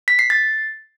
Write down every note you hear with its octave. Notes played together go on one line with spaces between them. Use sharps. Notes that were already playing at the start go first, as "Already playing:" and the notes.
B6
C7
A6